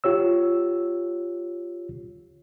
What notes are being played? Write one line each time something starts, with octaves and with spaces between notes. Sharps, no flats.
F4 G4 C#5 E6